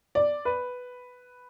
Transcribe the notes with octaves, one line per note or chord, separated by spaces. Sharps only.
D5
B4